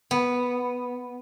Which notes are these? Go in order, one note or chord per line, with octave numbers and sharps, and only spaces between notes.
B3